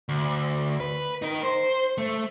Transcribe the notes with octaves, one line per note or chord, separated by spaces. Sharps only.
D2
B4
D#4 A#4
C5
A3